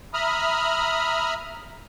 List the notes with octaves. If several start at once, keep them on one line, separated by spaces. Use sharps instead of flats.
E5 A#5 B5 D#6 F6